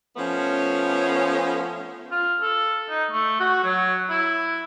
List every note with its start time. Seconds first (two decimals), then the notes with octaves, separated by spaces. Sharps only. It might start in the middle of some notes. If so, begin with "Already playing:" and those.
0.16 F3 A3 B3 C#4
2.11 F4
2.41 A4
2.89 D#4
3.11 A3
3.40 F#4
3.64 F#3
4.10 E4